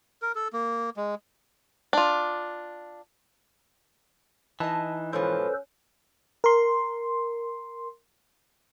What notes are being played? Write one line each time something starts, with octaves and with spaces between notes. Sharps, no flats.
A#4
A4
A#3
G#3
D4 F4
E3 D#4 D#5 A5
G#2 B2 F3 C#4 A4 B4 C5
A#4 C6